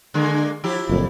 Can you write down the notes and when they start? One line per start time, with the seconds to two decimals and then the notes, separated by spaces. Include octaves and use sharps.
0.14 D3 G#3 A#3
0.64 F3 E4 G4
0.89 F#1 F2 A#2